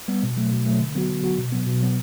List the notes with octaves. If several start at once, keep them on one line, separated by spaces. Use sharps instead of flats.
G3 B3
B2
F#3 A3
B2
F#3 A3
D3
F#3 B3 F#4
D3
F#3 B3 F#4
B2
F#3 B3
B2
F#3 B3